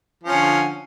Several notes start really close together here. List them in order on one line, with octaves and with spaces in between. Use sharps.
F3 C#4 D3